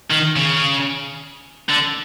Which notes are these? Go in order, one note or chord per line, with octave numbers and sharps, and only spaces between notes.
D#3
C#3
D3